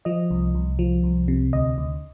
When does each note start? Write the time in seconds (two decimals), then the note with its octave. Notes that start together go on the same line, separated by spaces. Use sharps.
0.05 F3 D#5
0.31 C2
0.55 C2
0.79 F3
1.03 C2
1.28 C3
1.53 D2 D#5
1.78 D2